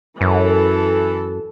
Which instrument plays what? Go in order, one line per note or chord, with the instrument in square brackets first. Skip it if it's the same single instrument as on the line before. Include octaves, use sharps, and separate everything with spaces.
[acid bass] F#2 [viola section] E3 A4